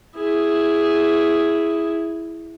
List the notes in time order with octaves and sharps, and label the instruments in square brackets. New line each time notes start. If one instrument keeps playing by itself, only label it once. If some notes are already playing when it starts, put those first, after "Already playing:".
[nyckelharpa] E4 G#4